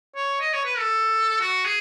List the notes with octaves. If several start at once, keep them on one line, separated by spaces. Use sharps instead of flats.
C#5
D#5
C#5
B4
A4
F#4
G#4